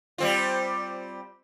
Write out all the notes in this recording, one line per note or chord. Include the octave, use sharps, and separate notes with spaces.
G3 C4 F4